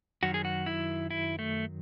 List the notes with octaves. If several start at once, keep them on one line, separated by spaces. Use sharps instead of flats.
F#2 D#3 F#3 F#4
G#4
F#4
E4
E4
A3